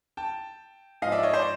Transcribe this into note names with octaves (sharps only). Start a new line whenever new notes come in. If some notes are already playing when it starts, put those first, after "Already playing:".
G5 A5
G#2 F3 D#5 F5
D5 E5
C#5 D#5
C5 D5